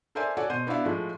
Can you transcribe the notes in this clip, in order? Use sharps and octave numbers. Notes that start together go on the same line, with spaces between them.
A4 A#4 C5 D5 E5 G#5
F#4 A4 C#5 D5 F#5 G#5
B2 C5 D#7
B3 D4 E4 F#4 E5 F5
A2 F3 G#3 A3